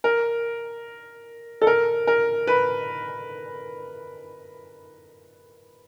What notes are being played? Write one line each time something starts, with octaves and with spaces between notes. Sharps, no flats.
A#4
A4
A#4
A#4
B4